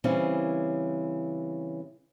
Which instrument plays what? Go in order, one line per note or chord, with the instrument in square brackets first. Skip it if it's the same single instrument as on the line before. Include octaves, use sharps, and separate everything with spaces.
[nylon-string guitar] C#3 E3 G3 C4 C#4